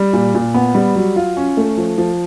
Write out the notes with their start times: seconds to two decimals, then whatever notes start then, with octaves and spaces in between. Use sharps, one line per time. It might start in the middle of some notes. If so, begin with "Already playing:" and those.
Already playing: G3
0.13 A#2
0.34 A#2
0.54 B3
0.75 G3
0.96 F#3
1.16 F4
1.37 C#4
1.57 A3
1.77 F3
1.98 F3